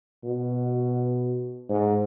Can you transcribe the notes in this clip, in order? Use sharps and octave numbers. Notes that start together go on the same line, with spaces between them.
B2
G#2